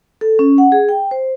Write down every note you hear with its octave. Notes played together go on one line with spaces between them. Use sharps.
A4
C#4
F#5
G#4
G5
C5